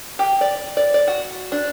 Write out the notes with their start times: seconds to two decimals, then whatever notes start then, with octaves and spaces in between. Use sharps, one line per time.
0.19 G4
0.41 D5
0.77 D5
0.94 D5
1.08 F#4
1.52 D4